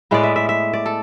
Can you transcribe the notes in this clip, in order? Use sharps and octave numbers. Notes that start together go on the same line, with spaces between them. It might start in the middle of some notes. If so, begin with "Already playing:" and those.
A2 G#3 B3 D5
E5
E5
E5
D5
A4